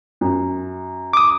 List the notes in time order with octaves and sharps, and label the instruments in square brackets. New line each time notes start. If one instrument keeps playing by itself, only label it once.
[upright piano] F#2
[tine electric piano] D6 D#6